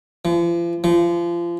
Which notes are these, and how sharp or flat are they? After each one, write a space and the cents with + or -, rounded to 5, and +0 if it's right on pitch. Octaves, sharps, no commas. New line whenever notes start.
F3 -40
F3 -30